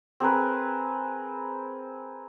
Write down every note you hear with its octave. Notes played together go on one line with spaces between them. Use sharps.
C4 G#4 A#4 B4